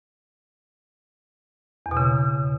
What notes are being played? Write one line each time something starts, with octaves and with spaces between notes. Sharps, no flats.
E2
B2
C#3